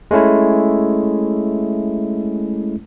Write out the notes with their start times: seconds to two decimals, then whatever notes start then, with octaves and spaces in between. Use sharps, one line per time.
0.11 G#3 A3 C#4 E4